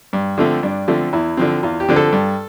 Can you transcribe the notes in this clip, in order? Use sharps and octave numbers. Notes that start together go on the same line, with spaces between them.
G2
D3 F3 A3 C4
G2 D4
D3 F3 A3 C4
E2 E4
D3 F3 C4
E2 F4
G4
D3 F3 C4
A4
G2